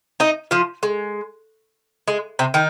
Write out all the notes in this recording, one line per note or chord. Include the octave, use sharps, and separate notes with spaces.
D#4 D#5
F3 F4
G#3
G#3
C3 C4
D#3 D#4